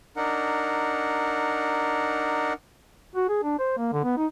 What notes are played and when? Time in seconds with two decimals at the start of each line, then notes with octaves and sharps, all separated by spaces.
0.17 D4 D#4 A#4 F#5
3.16 F#4
3.29 G#4
3.43 D4
3.59 C5
3.78 A#3
3.93 D3
4.04 B3
4.17 D#4